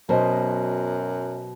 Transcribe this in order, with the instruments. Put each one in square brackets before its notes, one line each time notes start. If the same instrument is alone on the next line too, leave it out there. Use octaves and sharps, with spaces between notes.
[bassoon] F#2 [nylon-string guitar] B2 [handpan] F#3 C5 D#5